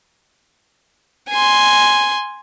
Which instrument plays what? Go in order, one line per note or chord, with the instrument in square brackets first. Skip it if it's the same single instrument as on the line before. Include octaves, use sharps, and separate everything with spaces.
[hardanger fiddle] G#5 C6